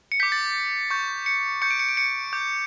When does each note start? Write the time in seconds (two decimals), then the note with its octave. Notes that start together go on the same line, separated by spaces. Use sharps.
0.12 C#7
0.20 D6 G6 B6
0.32 A6
0.90 C#6 G6
1.26 C#7
1.62 C#6 G6 C#7
1.71 D7
1.80 C#7
1.89 D7
1.97 C#7
2.33 D6 G6